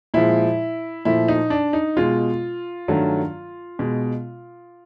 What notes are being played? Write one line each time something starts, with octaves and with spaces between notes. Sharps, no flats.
A#2 F3 G#3 E4
A#2 F3 A3 E4
D#4
D4
D#4
B2 G#3 F4
G2 D#3 F#3 A3
B2 G#3